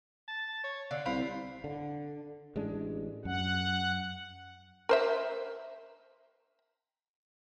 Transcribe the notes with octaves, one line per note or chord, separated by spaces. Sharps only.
A5
C#5
D3 F5
C2 C5 F5 B5
D3
A1 G#3 D4
F#2 F#5
A#4 C5 E5